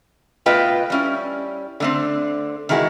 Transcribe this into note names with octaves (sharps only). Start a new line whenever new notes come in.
B2 A3 F4 B4 D#5 G5
G3 C#4 E4
D3 A3 C4
D#3 E3 G#3 E4 F#4